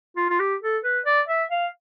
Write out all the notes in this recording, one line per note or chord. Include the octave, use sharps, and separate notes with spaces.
F4
F4
G4
A4
B4
D5
E5
F5